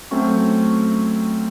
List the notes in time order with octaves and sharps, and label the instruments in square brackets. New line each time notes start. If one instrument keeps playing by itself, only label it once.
[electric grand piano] F#3 A3 C4 C#4 C#6